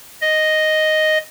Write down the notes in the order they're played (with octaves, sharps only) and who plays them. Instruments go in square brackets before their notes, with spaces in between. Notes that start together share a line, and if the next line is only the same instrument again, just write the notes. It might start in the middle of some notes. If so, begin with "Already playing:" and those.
[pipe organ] D#5